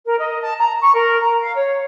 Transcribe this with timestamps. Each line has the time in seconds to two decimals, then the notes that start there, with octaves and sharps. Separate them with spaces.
0.05 A#4
0.18 D#5
0.41 A5
0.58 A#5
0.80 C#6
0.93 A#4
1.21 A#5
1.40 F5
1.55 C#5